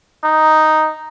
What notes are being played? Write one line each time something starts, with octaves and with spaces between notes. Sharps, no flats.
D#4